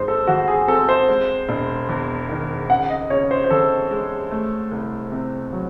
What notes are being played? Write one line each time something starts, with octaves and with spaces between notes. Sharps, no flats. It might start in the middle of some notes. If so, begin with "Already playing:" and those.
Already playing: G#2 D#4 C5
A4
E3 F#4
G#4
C4 A4
C5
G#3
E1
E2
D#3
C#3 F#5
D#5
C#3 C#5
C5
C5
E3 A4
G#3
A3
C2
C3
F#3